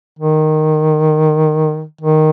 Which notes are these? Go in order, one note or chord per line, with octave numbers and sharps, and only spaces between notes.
D#3
D#3